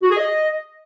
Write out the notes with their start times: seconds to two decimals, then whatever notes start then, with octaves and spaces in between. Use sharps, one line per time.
0.03 F#4
0.10 G#4
0.17 D#5